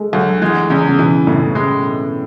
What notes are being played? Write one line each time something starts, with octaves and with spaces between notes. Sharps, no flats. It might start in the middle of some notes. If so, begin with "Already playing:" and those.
Already playing: G#3 A3
D2 F#3
E3 G#3
E2 C#3
C#3
B2 E3
A2 C#3
G#3